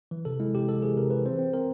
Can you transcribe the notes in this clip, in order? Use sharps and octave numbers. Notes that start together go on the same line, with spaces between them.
E3
C3 A4
G#3 E4
C3 G4
G#3 A4
E3 G#4
C3 A#4
E3 B4
C4 C5
C4
C4 A#4